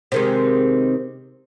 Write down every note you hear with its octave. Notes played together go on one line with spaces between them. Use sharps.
C3 D#3 G#3